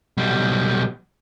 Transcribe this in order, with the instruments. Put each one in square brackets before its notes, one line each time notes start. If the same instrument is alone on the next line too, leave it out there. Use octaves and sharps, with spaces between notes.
[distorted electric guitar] B1 G3